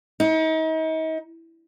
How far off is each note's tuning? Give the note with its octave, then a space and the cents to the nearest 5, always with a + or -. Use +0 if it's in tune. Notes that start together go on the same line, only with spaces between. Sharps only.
D#4 +40